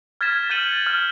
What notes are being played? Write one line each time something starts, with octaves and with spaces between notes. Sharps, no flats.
F6 G#6 A6 B6 E7
F6 G6 A6 C#7 D#7 F#7
F6